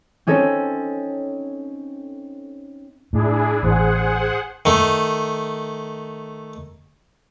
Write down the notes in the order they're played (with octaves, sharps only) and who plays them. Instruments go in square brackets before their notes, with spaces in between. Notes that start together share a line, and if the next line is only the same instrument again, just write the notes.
[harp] C4 C#4 D#4 A4 C#5
[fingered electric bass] A2 [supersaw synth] D4 E4 G#4
[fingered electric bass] A1 [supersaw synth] G#4 C5 F#5
[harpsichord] D#3 A3